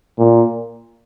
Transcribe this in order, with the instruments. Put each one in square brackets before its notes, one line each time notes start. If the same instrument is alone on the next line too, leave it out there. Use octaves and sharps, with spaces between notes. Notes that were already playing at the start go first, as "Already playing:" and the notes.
[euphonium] A#2